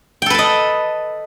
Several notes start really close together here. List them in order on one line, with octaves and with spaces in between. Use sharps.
G5 A4 B4 A5 D#5